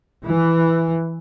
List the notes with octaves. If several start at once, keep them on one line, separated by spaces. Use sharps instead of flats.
E3